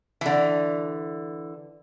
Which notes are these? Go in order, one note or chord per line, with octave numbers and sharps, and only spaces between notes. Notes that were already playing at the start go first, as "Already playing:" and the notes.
D3 E3